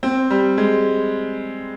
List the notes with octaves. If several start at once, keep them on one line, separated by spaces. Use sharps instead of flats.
C4
G3
G#3